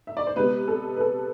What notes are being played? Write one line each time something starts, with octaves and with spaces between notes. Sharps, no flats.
E5
D5
C5
C3 G#3 B3 B4
A4
B4
A4